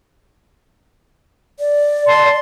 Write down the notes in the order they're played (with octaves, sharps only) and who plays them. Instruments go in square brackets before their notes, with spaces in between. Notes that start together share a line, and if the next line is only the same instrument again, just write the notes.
[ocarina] D5
[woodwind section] A5 C6